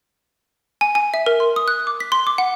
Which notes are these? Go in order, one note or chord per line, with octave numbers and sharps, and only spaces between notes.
G#5
G#5
E5
A#4
C6
D#6
F#6
D6
B6
C6
D6
F#5